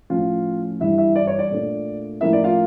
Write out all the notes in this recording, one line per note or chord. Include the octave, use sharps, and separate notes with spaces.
A2 F3 C#4 F4 F5
G2 E3 G3 D4 E4 E5
E4 E5
D5
C#5
D5
A#2 A3 D4
A2 F3 A#3 C#4 E4 E5
D5
F4 F5